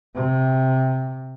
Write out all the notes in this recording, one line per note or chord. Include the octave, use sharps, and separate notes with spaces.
C3